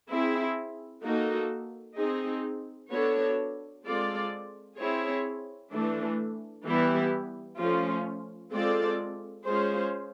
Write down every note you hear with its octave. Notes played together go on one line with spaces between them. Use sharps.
C4 E4 G#4
A#3 D#4 F#4 A4
C4 D#4 G#4
B3 D4 F#4 A4 C#5
G#3 C4 F4 A4 D5
C4 E4 G#4 C#5
E3 A3 D4
E3 G3 B3 E4 G4
F3 A3 C#4 F4
G#3 C4 F4 A4 D5
G#3 C#4 F4 G#4 C5